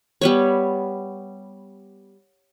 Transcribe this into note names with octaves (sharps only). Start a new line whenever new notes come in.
G3 B3 C#5